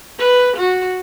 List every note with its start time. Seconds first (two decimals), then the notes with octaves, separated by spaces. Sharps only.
0.20 B4
0.57 F#4